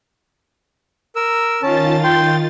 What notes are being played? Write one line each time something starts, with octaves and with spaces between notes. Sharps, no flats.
A#4 E6
D#3 C#4 F4 A5 A6
G5 C6